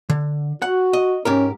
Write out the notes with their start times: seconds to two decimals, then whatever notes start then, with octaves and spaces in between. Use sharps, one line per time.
0.10 D3
0.62 F#4 F#5
0.93 D#5
1.25 G#2 C#4 G4 A#4